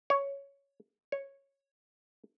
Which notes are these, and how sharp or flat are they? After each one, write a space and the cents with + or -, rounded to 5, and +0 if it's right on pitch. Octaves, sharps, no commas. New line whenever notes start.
C#5 +5
C#5 -10